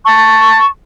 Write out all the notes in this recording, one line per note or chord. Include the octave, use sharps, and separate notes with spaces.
A5 C#6